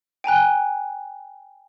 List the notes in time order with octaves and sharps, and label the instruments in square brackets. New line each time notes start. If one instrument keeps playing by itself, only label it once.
[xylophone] G5 G#5 A#5 F#6